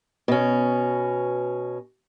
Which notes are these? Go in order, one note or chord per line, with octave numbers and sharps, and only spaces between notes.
B2 C#4